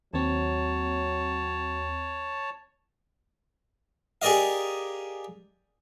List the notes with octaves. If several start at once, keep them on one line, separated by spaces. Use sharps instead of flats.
D#2 F#3 C4 C#5 A5
G4 G#4 A#4 D5 D#5 F5